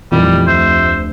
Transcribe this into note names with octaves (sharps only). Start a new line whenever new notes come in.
F1 A#2 D#3 E3 G3
D2 C5 E5